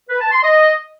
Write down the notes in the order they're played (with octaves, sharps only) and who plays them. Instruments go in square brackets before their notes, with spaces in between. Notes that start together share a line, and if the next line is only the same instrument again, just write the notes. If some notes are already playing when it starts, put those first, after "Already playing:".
[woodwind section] B4
A5
C6
D#5